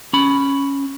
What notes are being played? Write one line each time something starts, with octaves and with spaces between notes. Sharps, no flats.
C#4 B5